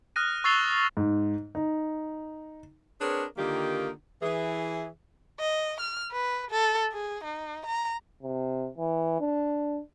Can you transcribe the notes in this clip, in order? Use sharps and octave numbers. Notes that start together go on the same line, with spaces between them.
D#6 F6 F#6 A#6 D#7
C#6 E6 A6 C7 F7 G7
G#2
D#4
C4 D4 G#4 A#4 B4 C#5
D3 D#3 A#3 D#4 F4 G4
E3 G#4
D#5
F6
B4
A4
G#4
D#4
A#5
C3
E3
D4